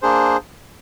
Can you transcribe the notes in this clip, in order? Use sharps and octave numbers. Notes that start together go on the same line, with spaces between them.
A#3 D4 G#4 C5